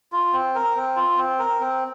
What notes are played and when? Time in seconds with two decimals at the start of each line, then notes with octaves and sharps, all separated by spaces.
0.12 F4
0.33 C4
0.55 A#4
0.76 C4
0.96 F4
1.17 C4
1.39 A#4
1.60 C4